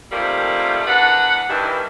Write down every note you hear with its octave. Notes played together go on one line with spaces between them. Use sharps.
C3 D#3 F3 G3 A3 A#3
E2 D4 A#4 B4 F#5
G2 D#3 E3